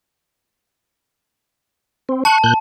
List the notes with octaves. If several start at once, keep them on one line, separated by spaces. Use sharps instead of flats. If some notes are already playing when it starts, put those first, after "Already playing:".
C4
A5 C#6 F#6
A#2 F#6 G6